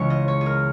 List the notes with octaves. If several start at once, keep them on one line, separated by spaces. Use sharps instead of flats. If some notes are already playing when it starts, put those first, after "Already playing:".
Already playing: C#2 C#3 E3 G#3 C#5
D#5
C#5
G#4
A#4